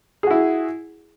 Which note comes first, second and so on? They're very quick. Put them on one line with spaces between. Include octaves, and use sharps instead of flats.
G#4 F#4 E4